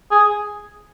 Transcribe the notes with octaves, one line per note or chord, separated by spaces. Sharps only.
G#4